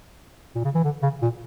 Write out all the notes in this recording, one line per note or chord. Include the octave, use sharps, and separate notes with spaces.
A#2
C#3
E3
D3
C#3
A#2